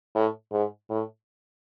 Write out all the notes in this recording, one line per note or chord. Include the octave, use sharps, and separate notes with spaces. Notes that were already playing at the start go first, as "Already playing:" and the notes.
A2
G#2
A2